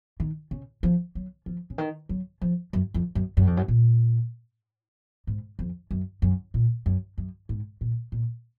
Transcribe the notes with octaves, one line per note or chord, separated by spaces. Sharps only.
D#3
C#3
F3
F#3
F3
C#3
D#3
F#3
F3
F#2
F2
F#2
F#2
F2
F#2
A#2
G#2
F2
F#2
F#2
A#2
F#2
F#2
G#2
A#2
A#2